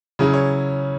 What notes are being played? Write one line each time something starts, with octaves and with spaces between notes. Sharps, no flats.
C#3 F#3 C#4 E4
C#5